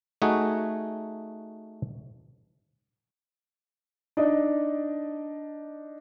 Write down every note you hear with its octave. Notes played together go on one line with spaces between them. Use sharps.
A3 D#4 F#4 G#4
D4 D#4 D5 D#5